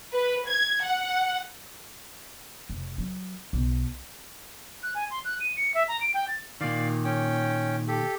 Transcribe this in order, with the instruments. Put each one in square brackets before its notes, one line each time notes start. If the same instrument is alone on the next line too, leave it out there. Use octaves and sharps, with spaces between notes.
[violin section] B4
G#6
F#5
[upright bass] F1
F#3
B1
[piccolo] F#6
G#5
C6
F#6
D#7
C#7
E5
A#5
D7
G5
A6
[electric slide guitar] A#2 D#3 [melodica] D5 F5
[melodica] C#4 G5
G4 A4